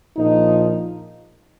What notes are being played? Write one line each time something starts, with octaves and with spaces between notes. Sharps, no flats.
A#1 A#2 F3 D#4